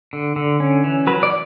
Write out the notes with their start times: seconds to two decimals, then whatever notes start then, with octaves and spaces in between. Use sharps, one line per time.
0.13 D3
0.36 D3
0.60 C#4
0.84 E3
1.07 F#3 B4
1.23 D5